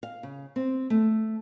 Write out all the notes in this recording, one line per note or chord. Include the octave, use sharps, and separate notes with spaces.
F5
C#3
C4
A3